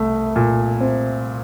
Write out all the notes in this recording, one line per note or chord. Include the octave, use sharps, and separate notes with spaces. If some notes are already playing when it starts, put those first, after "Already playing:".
Already playing: C2 A3
A#2
C4